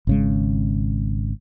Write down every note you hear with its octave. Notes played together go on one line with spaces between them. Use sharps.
G#1 C#3 G#3